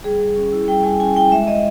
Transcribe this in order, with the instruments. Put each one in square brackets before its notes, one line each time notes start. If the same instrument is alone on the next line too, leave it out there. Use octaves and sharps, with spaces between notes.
[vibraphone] G3 G#4
G3
C#4
E4
G3 G5
G3 G#5
C#4 G#5
E4 G5
G#3 E5
G#3 D#5